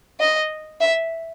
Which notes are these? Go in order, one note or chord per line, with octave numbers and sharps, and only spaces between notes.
D#5
E5